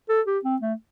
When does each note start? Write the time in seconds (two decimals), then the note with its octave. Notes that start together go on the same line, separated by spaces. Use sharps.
0.09 A4
0.26 G4
0.44 C4
0.62 A3